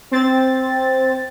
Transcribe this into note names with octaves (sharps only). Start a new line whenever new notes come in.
C4 A6